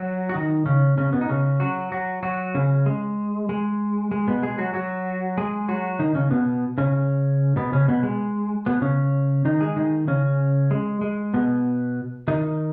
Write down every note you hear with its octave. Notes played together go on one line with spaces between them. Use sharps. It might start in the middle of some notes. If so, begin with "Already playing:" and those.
Already playing: F#3 F#4
F#4
D#3 D#4
C#3 C#4
C#3 C#4
B2 B3
D#4
C#3 C#4
F#3 F#4
F#3 F#4
F#3 F#4
C#3 C#4
G#3
G#3
G#3
B2 B3
G#3 G#4
F#3 F#4
F#3 F#4
G#3 G#4
F#3 F#4
D#3 D#4
C#3 C#4
B2 B3
C#3 C#4
B2 B3
C#3 C#4
B2 B3
G#3
B2 B3
C#3 C#4
D#3 D#4
G#3 G#4
D#3 D#4
C#3 C#4
G#3
G#3
B2 B3
D#3 D#4